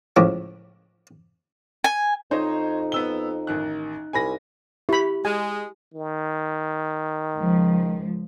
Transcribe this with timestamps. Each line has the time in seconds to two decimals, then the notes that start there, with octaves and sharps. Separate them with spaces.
0.16 C#2 A2 F3 D6
1.84 G#5
2.31 F2 D#4 C5 C#5 D#5
2.92 B3 E6 G7
3.47 A1 D#3 F#6
4.13 C2 G#5 B5 A#6
4.89 E4 G4 B5
5.25 G#3 G#5
5.94 D#3
7.37 C#2 F3